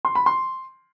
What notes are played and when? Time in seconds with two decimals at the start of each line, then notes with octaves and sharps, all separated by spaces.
0.05 C6
0.15 B5
0.26 C6